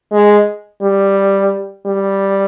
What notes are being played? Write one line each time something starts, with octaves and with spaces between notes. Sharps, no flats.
G#3
G3
G3